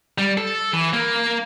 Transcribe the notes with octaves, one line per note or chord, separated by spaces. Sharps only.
G3
A4
E3
A#3